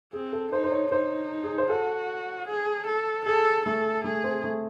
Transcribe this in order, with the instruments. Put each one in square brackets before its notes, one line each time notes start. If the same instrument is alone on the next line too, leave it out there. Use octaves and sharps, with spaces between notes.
[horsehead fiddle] C4 [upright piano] G#4
[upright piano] A4
[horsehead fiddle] D#4 [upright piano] C5
[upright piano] C5
C#5
[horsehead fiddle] D#4 [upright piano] C5
[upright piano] G#4
C5
[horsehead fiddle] F#4 [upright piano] A4
[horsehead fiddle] G#4
A4
[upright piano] G#4 [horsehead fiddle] A4
[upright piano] A3 [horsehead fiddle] A4
[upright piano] A3 [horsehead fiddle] G#4
[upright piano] C4
A3